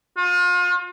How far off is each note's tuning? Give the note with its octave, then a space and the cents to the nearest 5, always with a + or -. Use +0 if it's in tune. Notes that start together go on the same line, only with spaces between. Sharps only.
F4 +35